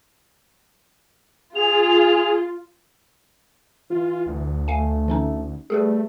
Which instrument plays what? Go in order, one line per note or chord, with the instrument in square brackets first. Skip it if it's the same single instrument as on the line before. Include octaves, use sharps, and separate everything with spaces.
[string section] F4 [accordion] G#4 [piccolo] F7
[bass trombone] E3 [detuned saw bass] F4
[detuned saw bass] D2
[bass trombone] A3 [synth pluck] F5 G#5
[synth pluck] E3 C#4 D#4
[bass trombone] G3 [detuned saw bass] A3 [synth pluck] G#4 A4 B4